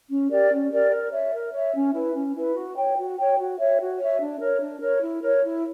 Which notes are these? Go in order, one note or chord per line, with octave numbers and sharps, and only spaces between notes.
C#4
G4 A#4 D5
C#4
G4 A#4 D5
A#4
C#5 E5
A#4
C#5 E5
C#4
E4 B4
C#4
E4 B4
F#4
C#5 G5
F#4
C#5 G5
F#4
C#5 E5
F#4
C#5 E5
D4
A#4 C#5
D4
A#4 C#5
E4
A#4 C#5
E4